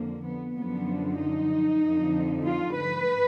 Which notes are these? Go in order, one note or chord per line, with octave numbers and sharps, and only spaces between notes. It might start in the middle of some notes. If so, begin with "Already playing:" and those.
Already playing: F2 D3 F3 A#3
B3
F#2 D3 F3 B3
D#4
F2 D3 F3
F4
B4